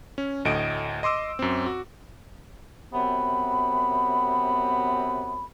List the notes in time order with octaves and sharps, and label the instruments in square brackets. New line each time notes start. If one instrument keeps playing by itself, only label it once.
[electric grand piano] C#4
D2 A2 D#5 D7
D#5 C6 D6 E6
F#2 C4
F#4
[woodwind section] F#2 C3 B3 C4 B5